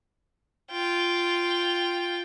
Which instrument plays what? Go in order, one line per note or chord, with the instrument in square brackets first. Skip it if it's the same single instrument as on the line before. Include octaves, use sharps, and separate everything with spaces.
[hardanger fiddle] F4 G5